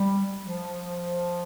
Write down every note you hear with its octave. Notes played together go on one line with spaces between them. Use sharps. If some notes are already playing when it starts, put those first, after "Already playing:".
Already playing: G3
F3